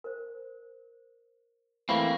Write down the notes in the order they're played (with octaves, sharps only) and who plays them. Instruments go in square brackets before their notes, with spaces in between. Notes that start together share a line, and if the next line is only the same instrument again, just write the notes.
[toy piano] A#4 C5
[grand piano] E3 A3 [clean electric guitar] A#3 C4 [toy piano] F5 [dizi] B5